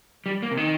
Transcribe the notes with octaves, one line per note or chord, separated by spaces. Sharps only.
G3
A#3
C3
D#3